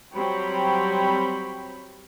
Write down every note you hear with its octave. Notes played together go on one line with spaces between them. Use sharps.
F#3 G3 C4 C#5 G5 B5